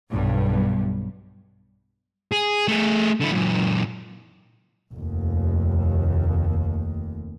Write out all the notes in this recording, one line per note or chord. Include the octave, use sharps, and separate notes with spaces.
B1 G2
G#4
A3 G#4
D3 E4
F#2 A#2
F1 D#2